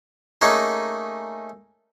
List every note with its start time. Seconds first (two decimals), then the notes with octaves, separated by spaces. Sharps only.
0.41 A3 A#3 C#4 D#4 G#4